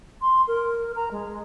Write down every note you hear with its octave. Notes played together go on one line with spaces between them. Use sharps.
C6
A#4
A#5
G#3